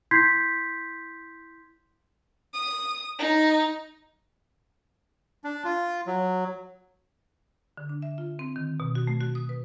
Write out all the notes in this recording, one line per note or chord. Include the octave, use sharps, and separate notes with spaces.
E4 C6 G6 G#6 B6 C7
D#6
D#4
D4
F4
F#3
D3
D4
E5
F4
C4
D#3
B2
F#4
A3
F#4
D#6
B4